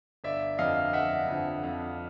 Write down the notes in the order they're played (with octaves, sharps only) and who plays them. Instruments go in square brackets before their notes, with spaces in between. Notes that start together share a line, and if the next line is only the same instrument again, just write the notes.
[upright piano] G1 [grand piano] D5 E5
[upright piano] F2 D3 F3 [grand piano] D#5 F5
[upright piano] G1 [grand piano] E5 F#5
[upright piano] F2 D3 F3
F2